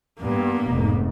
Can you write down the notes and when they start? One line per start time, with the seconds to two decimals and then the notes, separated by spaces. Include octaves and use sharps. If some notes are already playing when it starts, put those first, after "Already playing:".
0.21 G2 A#3 B3
0.68 F1 G#2